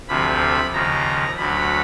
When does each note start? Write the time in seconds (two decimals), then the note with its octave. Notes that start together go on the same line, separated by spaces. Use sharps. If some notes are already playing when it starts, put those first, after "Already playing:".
0.08 D2 C3 F3 B5
0.73 D#2 C#3 F3 A#5
1.37 D2 D3 F#3 B5